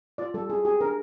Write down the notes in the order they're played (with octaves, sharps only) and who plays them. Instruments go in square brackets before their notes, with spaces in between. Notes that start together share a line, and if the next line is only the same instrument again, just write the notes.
[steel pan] F4 D5
G3 A4
E4 G#4
G4 G#4
D4 A#4